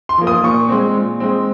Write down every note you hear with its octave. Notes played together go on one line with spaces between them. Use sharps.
C6
F3 A#3
D#6
A#2 C#6
G#3 C4
A#2
G#3 C4